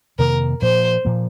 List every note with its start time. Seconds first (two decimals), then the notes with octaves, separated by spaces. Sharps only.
0.19 F2 C3 D#3 A#3 A#4
0.62 A#2 F3 A#3 C5
1.05 A#2 F3 A#3